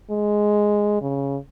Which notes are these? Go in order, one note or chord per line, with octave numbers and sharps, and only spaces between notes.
G#3
C#3